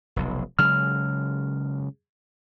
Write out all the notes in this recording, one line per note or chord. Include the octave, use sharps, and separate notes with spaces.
F1 B1
C#3 F#3 G#3 F6